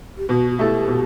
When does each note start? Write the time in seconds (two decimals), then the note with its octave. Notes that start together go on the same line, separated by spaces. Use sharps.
0.18 G4
0.29 B2 F#4
0.51 F#4
0.58 A3 E4 G4 A4
0.88 B2